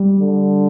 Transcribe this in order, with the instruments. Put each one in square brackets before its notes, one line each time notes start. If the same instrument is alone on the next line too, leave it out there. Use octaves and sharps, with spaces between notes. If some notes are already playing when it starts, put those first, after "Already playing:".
Already playing: [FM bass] G3
[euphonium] D3